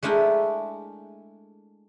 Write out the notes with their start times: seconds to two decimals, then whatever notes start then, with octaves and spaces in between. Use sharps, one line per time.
0.03 G#3 A3 D4 E4 A#4 G5